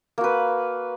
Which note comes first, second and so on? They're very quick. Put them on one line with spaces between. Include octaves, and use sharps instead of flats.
A#3 F#4 B4